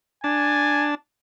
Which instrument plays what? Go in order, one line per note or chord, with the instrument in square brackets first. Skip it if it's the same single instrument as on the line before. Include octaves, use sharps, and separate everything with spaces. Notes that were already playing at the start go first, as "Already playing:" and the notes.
[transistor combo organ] D4 A5 [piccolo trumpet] G#5